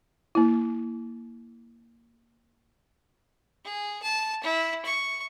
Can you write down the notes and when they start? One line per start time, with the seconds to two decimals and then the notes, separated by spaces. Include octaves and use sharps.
0.35 A#3 E4
3.65 G#4
4.02 A5
4.43 E4
4.85 C#6